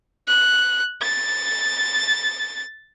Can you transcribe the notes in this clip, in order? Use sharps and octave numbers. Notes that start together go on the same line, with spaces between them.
F#6
A6